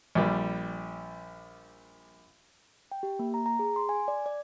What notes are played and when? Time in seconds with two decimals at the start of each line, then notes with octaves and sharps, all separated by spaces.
0.15 A#1 G3
2.92 G5
3.03 G4
3.19 A#3
3.34 A#5
3.46 A#5
3.59 G#4
3.76 C6
3.89 G#5
4.08 D5
4.26 D5